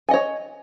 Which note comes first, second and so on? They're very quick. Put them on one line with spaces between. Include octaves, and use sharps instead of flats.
G#5 D#5 C#5